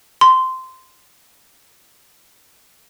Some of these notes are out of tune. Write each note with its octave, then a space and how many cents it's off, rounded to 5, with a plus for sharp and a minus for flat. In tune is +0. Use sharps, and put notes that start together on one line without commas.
C6 -15